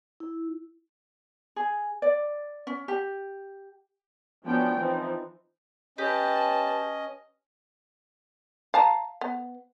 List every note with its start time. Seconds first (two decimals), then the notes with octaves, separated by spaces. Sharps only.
0.20 E4
1.56 G#4
2.02 D5
2.67 C#4
2.88 G4
4.45 F3 F#3 B3 C#4 D4 G5
4.77 E3 F3 C4 D#4
5.98 C#4 G4 B4 D#5 A5
8.74 F5 A5 A#5
9.21 B3